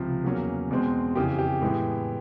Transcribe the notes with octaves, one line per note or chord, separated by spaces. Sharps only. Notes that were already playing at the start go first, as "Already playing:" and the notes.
Already playing: C#2 C3 F3
E2 C#3 F#3 A#3 C#4
E2 B2 G#3 C4
F2 C#3 E3 G4
G4
A2 E3 G#3 B3